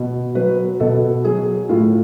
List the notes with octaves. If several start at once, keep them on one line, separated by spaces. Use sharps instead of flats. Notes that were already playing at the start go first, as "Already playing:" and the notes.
Already playing: B2
F#3 B4
B2 A4
F#3 G#4
A2 F4